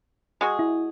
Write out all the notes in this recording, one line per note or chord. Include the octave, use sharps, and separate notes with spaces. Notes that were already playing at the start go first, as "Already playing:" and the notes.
G#3 F#4 G#4
E4